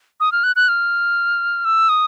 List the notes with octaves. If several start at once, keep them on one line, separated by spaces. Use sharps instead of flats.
D#6
F6
F#6
F#6
F6
E6
D#6